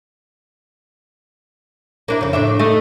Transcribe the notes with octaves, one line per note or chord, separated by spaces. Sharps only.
A#3 D4 E4
F2 C#3
A2 D4 E5
A3 D#4 D#5